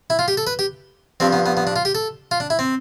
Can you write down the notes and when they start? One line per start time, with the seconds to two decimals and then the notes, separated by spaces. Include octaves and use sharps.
0.10 E4
0.19 F4
0.28 G4
0.37 A4
0.47 B4
0.59 G4
1.20 G2 F3 C4
1.33 B3
1.46 B3
1.57 B3
1.67 D4
1.76 F4
1.85 G4
1.95 A4
2.31 F4
2.40 D4
2.50 E4
2.59 C4